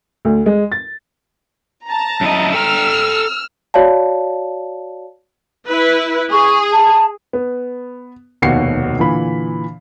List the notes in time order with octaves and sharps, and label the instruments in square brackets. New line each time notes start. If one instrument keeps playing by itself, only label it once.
[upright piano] D2
G#3
A6
[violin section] A5 A#5
[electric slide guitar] F#2 E4 D#5
[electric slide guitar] A4 G5 A#5 [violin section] E6 F6
[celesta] F#4 C#5 D5 F5 A5
[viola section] E4 B4
[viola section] G#4 [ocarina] C#6
[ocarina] A5
[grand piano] B3
F1 D#2 B2 F#4 C7 C#7
A#2 D3 E3 B5